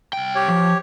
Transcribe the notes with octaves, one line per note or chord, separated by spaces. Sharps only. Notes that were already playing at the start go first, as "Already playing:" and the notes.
C2 G5
G4 C#5
F3